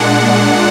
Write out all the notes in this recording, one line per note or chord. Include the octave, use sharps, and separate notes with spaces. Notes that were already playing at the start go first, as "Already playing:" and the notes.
Already playing: A#2 G#3 D4 F#5